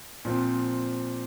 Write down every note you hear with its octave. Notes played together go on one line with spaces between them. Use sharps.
A#2 F3 C4